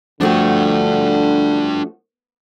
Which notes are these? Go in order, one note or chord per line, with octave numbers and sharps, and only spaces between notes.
D3 F3 A3 D4 F#4 G5